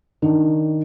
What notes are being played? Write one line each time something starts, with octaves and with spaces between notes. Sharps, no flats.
D#3 D4